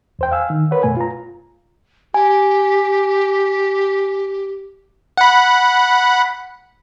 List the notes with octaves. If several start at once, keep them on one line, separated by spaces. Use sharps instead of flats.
E2 C5 G5
F5 G#5 E6
D#3
A#4 B4 C#5 F#5
F#2 B2 A3 B4 G#5
F4 A#5
G4 G#5
F#5 B5